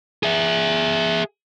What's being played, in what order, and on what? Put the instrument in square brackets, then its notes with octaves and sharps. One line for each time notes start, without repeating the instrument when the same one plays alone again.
[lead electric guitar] G#4 E5